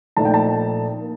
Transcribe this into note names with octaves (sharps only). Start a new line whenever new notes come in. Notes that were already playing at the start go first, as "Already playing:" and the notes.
A#1 A#2 A3 D#4 A5
G5
A5
A#3